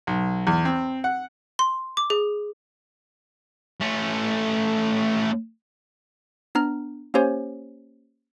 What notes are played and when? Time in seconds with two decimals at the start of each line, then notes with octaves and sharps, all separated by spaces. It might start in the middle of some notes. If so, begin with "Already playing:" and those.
0.07 B1
0.47 E2
0.65 C4
1.04 F#5
1.59 C6
1.97 D6
2.10 G#4
3.81 A3 C#4
6.55 B3 D4 A#5 F6
7.14 A#3 C#4 G4 C5 C#5 G#5